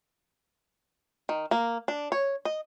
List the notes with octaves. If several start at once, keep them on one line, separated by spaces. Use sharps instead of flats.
D#3
A#3
D4
C#5
D#5